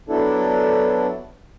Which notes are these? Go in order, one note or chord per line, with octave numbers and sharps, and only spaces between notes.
F#3 B3 D4 E4 A4